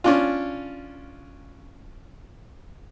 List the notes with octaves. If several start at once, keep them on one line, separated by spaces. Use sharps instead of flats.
C#4 D4 F4